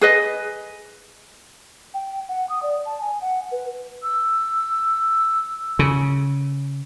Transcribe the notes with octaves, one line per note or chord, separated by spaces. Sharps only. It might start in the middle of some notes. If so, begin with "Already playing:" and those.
G#4 B4 D#5
G5
F#5
D#6
D5
A5
G#5
F#5
B4
E6
C#3